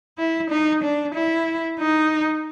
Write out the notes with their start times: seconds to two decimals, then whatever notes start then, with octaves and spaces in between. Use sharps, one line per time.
0.18 E4
0.50 D#4
0.83 D4
1.14 E4
1.79 D#4